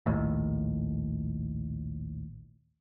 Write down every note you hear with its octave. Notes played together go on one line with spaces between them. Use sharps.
A#1 D#2 A2